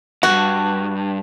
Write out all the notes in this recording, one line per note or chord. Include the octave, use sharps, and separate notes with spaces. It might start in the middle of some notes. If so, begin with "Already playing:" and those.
E2 G2 F#4